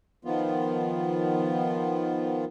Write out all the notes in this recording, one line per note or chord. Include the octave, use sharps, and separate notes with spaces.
D#3 F3 B3 F4